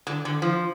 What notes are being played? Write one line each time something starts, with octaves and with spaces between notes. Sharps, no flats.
D3
D3
F3